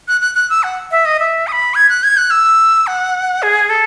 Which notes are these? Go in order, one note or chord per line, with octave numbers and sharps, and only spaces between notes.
F#6
F#6
F#6
E6
F#5
E5
D#5
E5
D#6
B5
G#6
F#6
G#6
F#6
E6
F#5
G#4
A4